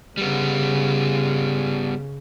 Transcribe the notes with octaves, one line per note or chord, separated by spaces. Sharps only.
C#3 G3 B3